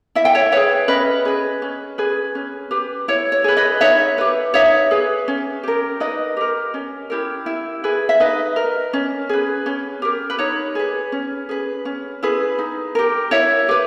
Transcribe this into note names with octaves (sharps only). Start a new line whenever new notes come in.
E4 E5
G5
C#5 E5
G#4 B4 C#5 E5
C#4 B4 D#5
G#4 B4
C#4
G#4 B4
C#4
G4 B4
E4 C#5
C#5
G#4 B4
B4 D#5
D#4 C#5 E5
G4 B4
D#4 C#5 E5
G#4 B4
C#4
G4 A#4
D#4 B4 D#5
G4 A#4
C#4
E4 G4 A#4
E4
G#4 B4
E5
D#4 B4 D#5
A#4
C#4
G#4 B4
C#4
G4 A#4
B4
D#4 C#5
G#4 B4
C#4
G#4 B4
C#4
E4 G#4 B4
D#4
G4 A#4
E4 C#5 E5
G4 B4